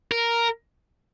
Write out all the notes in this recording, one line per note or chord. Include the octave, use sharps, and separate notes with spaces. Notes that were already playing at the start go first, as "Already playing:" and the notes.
A#4